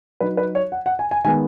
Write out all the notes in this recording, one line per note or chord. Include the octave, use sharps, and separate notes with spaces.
F#3 D#4 B4
B4
C#5
F#5
F#5
G#5
G#5
D#3 G#3 B3 G#5